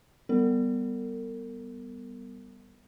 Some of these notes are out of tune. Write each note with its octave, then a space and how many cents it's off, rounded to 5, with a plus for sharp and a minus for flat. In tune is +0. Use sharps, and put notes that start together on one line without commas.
G3 +0 B3 +0 A#4 -45